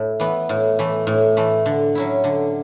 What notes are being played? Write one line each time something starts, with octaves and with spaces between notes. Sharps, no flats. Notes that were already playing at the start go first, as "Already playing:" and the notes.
Already playing: A2
E3 B3
A2
E3 A3
A2
E3 A3
D3
F#3 C#4 E4
D3